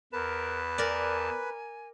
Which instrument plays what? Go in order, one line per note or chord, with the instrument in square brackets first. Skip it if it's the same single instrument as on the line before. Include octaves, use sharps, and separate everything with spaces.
[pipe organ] E2 A5 [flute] A#4 [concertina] B4
[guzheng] A#4 D5 [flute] G#5